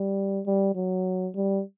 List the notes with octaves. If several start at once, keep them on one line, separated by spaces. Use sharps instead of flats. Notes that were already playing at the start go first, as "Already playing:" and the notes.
Already playing: G3
G3
F#3
G3